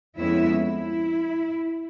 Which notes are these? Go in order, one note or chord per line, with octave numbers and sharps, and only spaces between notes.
F2 G#3 B3 C#4 E4 E5
E4